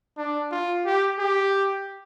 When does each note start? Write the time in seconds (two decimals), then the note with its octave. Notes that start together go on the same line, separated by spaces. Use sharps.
0.18 D4
0.51 F4
0.85 G4
1.19 G4